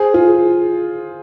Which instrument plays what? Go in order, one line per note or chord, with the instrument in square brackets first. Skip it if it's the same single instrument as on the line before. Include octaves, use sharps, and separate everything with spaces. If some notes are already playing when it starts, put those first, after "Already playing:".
Already playing: [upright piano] G#4 C5
F4 G#4